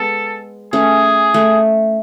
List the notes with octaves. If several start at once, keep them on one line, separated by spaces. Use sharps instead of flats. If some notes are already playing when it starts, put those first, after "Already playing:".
Already playing: G#3 B3 A4
A3 C#4 G#4
A3